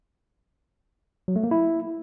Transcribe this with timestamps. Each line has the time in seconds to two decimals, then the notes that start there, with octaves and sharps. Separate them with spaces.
1.28 F#3
1.36 A3
1.44 A#3
1.51 E4